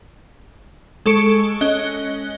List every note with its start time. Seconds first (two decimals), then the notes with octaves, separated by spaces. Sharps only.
1.06 G#3 A4 C#6 C#7 D7
1.61 C#4 D#5 F#6 G7